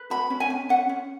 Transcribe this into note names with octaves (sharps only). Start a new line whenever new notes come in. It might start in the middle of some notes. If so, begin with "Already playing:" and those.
Already playing: B4
F#4 B5
C#4
G#5
C#4
C#4 F#5
C#4